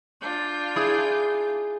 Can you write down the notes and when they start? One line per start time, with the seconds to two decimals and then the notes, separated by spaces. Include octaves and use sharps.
0.21 D4 F4 G6
0.76 E4 G#4 D#6